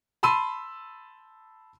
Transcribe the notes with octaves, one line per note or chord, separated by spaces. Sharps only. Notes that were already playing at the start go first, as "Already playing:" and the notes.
A5 B5 C6 E6 D#7